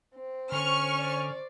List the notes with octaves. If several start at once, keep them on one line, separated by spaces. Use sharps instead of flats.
C4
D3 C#4 C#6 F6
C5 D5